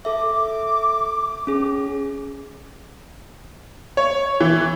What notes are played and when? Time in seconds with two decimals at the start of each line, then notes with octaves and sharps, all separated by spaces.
0.05 A4 E5 D6
1.47 C#4 G#4
3.97 C#5
4.41 E3